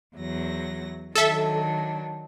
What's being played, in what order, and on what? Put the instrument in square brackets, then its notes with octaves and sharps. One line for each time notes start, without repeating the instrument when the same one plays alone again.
[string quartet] E2 F#3 A#6
[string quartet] D#3 F#3 D4 [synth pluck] A4 E5